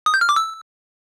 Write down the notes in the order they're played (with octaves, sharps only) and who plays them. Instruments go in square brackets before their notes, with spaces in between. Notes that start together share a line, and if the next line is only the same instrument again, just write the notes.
[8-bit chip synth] D#6
G6
F6
D6
E6